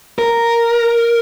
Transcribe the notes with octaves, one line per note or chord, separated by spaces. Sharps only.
A#4